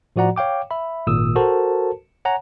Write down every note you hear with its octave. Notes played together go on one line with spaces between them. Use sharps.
A2 F3 F#4 D5 F#5 A#5
C#5 F5 G5 D6
E5 B5
G#1 A#2 D#6 E6
F#4 A4 A#4 C5 A5
C#5 F#5 G#5 A#5